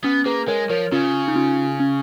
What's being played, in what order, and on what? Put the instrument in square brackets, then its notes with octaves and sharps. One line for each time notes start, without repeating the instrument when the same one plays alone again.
[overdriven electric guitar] B3 [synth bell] C#4
[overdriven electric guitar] A#3 [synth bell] G#4 B4
[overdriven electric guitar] G#3 [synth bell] A#4 C#5
[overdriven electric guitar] F3 [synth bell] A#4 C#5
[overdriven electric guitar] C#3 [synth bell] C#4 F4
[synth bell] D#4
C#4 F4
C#4